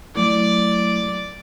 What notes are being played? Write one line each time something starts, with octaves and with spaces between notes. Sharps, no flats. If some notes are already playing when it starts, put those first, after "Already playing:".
F#3 A3 E4 D5